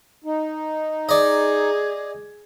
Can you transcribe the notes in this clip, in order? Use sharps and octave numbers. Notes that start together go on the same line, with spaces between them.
D#4
G#4 D5 D#5